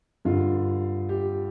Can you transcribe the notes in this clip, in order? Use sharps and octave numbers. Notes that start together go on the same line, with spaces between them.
G2 D3 F4
G4